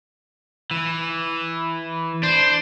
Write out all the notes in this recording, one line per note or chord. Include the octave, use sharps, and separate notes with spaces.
E3
D4 C5